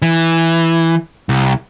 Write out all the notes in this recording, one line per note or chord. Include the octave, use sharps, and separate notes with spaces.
E3
C2